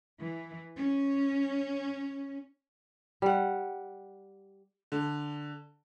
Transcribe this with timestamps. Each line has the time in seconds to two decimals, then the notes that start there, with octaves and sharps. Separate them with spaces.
0.19 E3
0.76 C#4
3.22 G3 F#5
4.92 D3